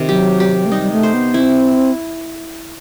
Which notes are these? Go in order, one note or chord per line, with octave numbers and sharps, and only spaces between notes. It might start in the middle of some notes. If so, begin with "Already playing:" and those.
Already playing: C3 D#3
F#3 G4
G4
A3
G3 D#4
G3
A3
C5
B3
C4 E4